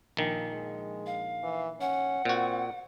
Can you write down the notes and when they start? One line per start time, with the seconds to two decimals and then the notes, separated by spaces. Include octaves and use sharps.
0.17 A#1 D#3
0.53 G#3
1.06 F5
1.43 E3
1.81 C#4 F#5
2.25 A#2 C4 F#4